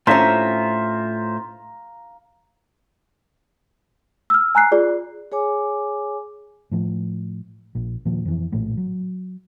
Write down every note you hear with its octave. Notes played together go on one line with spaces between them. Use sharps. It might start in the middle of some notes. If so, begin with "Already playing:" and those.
A2 C#4 F4 C5 E5 F5 A#5
E6 F6
G#5 A#5 F#6 C7
F4 G#4 D5
G#4 C#5 G#5 D6
A2 F3
A#1
D#2 A#2 F3
F2 E3
A#1 A2
F#3